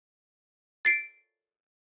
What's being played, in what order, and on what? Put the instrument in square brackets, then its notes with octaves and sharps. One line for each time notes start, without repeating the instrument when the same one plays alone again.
[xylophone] A6 C7 D7